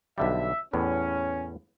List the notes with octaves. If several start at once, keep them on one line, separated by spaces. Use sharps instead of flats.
B1 D3 G3 E5
E2 A2 B3 C#4